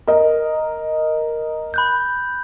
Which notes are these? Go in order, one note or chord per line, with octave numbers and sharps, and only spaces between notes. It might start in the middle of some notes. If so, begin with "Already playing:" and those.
A#4 D#5
B5 F#6 G6